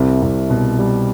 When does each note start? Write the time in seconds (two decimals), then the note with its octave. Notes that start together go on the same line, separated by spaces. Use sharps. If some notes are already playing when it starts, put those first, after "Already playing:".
Already playing: C2 C3
0.22 C2
0.50 B2
0.79 G3